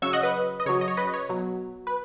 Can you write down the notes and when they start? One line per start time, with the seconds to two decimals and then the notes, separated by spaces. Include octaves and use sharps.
0.02 C#3 F#3 C#6 E6
0.13 D#5 F#5
0.23 B4 D#5
0.60 D#5
0.66 C#3 F#3 C#5
0.81 D#5
0.88 C#5
0.97 B4 D#5
1.14 C#5
1.29 B2 F#3
1.87 B4